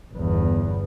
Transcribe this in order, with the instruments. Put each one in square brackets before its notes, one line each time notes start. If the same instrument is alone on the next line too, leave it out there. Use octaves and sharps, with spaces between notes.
[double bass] G1 E2